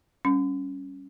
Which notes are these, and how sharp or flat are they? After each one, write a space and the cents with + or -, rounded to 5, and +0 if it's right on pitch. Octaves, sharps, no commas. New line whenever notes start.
G3 +0 C#4 +0